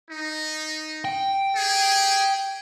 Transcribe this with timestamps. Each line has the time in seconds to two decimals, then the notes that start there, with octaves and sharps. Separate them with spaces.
0.10 D#4
1.05 G5
1.55 G4 G#4